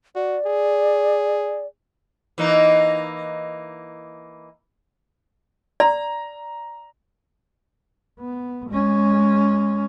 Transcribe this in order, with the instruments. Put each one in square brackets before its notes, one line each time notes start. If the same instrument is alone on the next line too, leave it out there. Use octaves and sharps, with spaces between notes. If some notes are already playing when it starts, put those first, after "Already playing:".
[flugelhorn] F#4 [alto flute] D5
[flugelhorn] G#4
[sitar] E3 A#3 D#4
[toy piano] D5 [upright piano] A#5
[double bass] B3
G#3 C#4